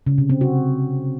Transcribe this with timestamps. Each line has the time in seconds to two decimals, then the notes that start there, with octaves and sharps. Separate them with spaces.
0.07 C#3
0.18 C3
0.30 C4
0.41 F#4